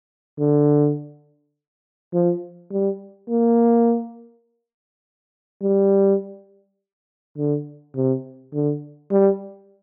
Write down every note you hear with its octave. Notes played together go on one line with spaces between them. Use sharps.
D3
F3
G3
A#3
G3
D3
C3
D3
G3